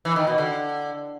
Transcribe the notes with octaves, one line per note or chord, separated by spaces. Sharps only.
E3
D#3
B2
D3